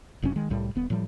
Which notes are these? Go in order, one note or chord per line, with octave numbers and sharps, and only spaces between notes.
F#1 F#2 C3 C#4
D#3 G#3
C2 A2 G3
D#1 B3
A2 F3 G3